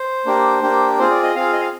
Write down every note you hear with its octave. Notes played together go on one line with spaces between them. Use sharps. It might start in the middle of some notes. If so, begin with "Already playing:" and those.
Already playing: C5
A#3 D4 G4
A#3 D4 G4
C4 F4 G#4 C5
D5
D#5
C4 F4 G#4 F5
D#5
F5